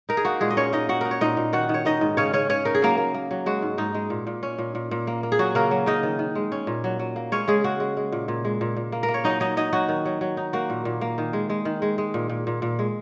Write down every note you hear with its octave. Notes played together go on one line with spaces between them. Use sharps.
D#4 A#4
G#4
A#3 F#4
A#2 G#3 G#4
D#5
A#2 C#4 C#5
A#3 D#4 D#5
D#4 F#4 F#5
D#4 A#4
C#5
A#2 D#4 D#5
A#2
D#3 F#4 F#5
D#3
C#5
D#3 D#4 D#5
G#2
C#3 C#4 C#5
C#3 C#4 C#5
C#3 C#4 C#5
D#4 A#4
G#4
F#3 A#3 A#4
A#3
A#3
F#3
G#3 F#4
G#2
G#2 D#4
G#3
A#2
A#2
C#4
A#2
A#2
A#2
A#3
A#3
G#4
F#3 F#4
C#3 A#3 A#4
F#3
C#3 D#4 D#5
D#3
D#3
G#3
C#4
A#2
F#3
F#3
A#3
G#3 C#4 C#5
C#3 G#3 G#4
C#3 F#4
G#3
G#3
A#2
A#2
G#3
A#2
A#2
A#3
A#4
A#3
C#5
F#3 D#4 D#5
F#3 D#4 D#5
F#3 D#4 D#5
F#3 F#4
D#3
F#3
F#3
D#4
A#3 F#4
A#2
A#2
A#3
D#3
G#3
G#3
D#3
G#3
G#3
A#2
A#2
A#2
A#2
G#3